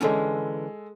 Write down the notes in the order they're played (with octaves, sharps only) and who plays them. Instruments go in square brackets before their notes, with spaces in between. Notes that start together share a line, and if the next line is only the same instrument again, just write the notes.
[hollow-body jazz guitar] D3 E3 C#4 [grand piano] G#3 A4